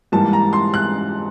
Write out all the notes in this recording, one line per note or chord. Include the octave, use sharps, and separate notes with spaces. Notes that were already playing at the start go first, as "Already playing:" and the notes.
G#2 E3 G3 A#3 A5
A#5
C6
F#6